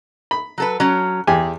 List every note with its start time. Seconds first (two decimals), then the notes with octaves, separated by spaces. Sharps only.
0.31 B5
0.58 F#3 A4 B4
0.80 F#3 C#4
1.27 E2 G4 G#4 G#5